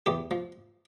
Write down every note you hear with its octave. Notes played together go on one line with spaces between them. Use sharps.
E2 G4
F3